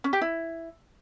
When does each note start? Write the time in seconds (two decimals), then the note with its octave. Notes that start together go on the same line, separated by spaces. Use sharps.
0.04 C#4
0.13 G4
0.21 E4